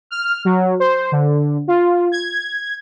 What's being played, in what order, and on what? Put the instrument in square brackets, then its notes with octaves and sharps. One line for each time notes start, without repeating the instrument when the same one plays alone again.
[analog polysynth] F6
F#3
C5
D3
F4
G#6